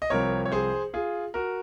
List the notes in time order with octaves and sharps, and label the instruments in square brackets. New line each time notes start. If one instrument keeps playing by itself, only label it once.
[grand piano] D#5
C2 C3 F3 C4 A#4 C#5
C#5
G#4 C5
F4 G#4
F#4 A#4